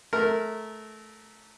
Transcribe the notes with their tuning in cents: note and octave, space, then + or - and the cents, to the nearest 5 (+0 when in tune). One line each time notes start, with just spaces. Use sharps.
A3 -20 A#4 -15